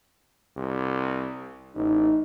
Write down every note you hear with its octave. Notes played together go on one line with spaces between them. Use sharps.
C2
A1 D#4